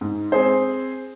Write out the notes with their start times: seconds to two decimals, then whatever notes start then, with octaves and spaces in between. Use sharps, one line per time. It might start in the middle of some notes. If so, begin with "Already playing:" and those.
0.01 G#2
0.32 C4 G#4 C5